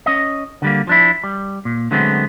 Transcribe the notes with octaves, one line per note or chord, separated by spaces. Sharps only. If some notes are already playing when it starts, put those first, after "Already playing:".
C#4 D#5
D3 G3 A#3
F3 D4 E4
G3
A#2
D3 F#3 G#3 A3 B3 C4